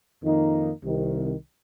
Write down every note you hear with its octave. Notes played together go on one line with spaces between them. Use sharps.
F2 D#3 A#3 D#4
C2 C3 D#3